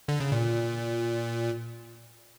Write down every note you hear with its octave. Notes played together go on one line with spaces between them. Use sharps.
D3
C#3
A#2